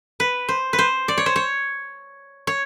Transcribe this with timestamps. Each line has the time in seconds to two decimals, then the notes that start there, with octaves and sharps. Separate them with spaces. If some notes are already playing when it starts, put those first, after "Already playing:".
0.20 B4
0.49 C5
0.73 B4
0.79 C5
1.08 D5
1.18 C#5
1.26 C5
1.36 C#5
2.47 C#5